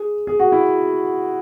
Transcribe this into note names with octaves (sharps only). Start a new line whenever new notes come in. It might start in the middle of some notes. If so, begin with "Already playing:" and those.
Already playing: G#4
G#4
F#4
E4